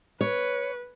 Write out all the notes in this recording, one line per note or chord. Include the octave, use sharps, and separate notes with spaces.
B4 C#5